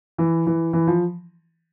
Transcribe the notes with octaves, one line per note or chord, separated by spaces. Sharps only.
E3
E3
E3
F3